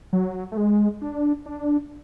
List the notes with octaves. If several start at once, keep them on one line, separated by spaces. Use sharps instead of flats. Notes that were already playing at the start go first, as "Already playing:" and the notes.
F#3
A3
G#3
D4
D4